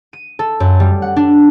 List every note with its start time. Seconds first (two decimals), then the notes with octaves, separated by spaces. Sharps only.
0.13 D#7
0.39 A4
0.60 F#2
0.80 G3
1.02 F#5
1.16 D4